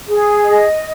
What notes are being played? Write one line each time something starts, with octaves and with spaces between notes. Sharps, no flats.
G#4
D#5